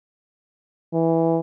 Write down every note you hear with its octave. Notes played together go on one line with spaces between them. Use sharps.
E3